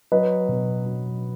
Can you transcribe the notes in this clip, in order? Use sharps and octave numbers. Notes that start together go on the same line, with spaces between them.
F#3 B4 D#5
B2
F#3